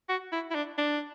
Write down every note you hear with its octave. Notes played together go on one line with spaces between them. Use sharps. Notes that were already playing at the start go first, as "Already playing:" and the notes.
F#4
E4
E4
D4
D4